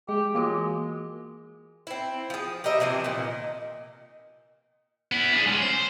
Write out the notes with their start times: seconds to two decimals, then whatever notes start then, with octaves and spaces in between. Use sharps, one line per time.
0.09 G#3 G4 G#4
0.35 E3 G#3 A#3 F4 F#4
1.87 C4 E4
2.30 F3 G#4
2.64 G3 A#4 D#5 E5
2.80 C3 E3 F3 C4
3.04 A#2 D#3
5.12 B3 E4
5.33 D4 G#4
5.46 G#3 C#4
5.62 C5